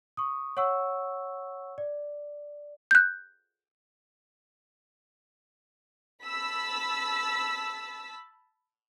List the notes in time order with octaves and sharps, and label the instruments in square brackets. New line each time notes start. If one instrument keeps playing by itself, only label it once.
[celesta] C#6 D#6
C#5 F#5 C#6 E6
D5
[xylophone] F#6 G6
[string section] A5 B5 E6 B6